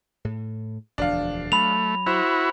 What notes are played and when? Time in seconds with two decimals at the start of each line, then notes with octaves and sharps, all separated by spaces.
0.25 A2
0.98 E1 D2 F3 D4 F5
1.52 F#3 A3 B5 F7
2.06 E4 F#4 C5